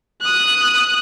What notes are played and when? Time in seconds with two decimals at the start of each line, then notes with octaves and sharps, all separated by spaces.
0.22 D#6 F#6